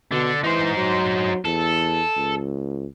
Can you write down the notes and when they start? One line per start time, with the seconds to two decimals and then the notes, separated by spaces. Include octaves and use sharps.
0.12 B2 D3
0.44 E3 D#4 C5
0.77 F#3
1.45 E2 A4
2.17 C#2